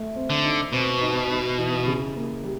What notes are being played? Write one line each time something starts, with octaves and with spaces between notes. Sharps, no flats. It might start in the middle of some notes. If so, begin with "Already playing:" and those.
Already playing: A3
C4
D3
D#4
B2 C4
D#4
D#4
E3
C#3
A#3
G3